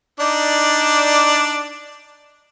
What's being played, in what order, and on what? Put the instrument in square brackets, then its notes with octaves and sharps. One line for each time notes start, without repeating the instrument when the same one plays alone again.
[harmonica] D4 D#4 D5